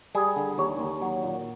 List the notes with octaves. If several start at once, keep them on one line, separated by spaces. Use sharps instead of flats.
G3 G#4
D3
D#2 C#5
D#2
F#3
A#2